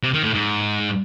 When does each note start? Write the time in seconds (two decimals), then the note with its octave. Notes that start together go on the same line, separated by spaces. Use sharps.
0.03 C3
0.13 D#3
0.24 A2
0.34 G#2